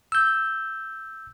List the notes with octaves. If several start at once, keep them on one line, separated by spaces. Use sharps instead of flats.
E6 G6